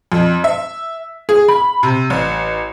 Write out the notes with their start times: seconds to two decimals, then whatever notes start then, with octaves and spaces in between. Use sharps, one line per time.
0.12 F2
0.44 E5
1.29 G#4
1.48 B5
1.83 C3
2.10 A1